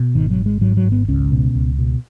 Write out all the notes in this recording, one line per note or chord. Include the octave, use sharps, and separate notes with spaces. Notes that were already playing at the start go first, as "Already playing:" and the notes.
Already playing: B2
G#1 D#3
F#3
G#2
G#3
G#2 F#3
F#3
G#1
B3
C#2 C#4
B2
C#2
B2